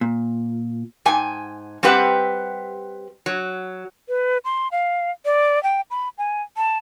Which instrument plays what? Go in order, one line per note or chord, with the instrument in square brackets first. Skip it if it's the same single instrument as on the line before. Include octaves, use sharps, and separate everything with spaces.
[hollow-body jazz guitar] A#2
[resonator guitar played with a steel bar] G#2 G5 G#5
G3 C4 G4 B4 E5 F#5
F#3
[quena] B4
C6
F5
D5
G5
B5
G#5
A5